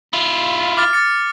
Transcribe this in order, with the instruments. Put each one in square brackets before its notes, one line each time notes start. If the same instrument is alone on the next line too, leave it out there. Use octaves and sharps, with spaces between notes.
[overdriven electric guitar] E4 F4
[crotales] D6 F6 A6
D6 A6 C#7